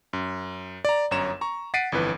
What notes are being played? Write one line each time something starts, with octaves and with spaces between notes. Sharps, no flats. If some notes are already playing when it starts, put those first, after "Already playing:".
F#2
D5 A#5
G1 F#2 C#5 A#5 E7
A#5 C#6
F#5 A6 B6 C7 D7 D#7
G1 F2 E3 B4